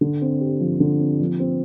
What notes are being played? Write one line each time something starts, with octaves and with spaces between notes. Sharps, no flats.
D3
C4
G4
F3
D3
C4
F3
C4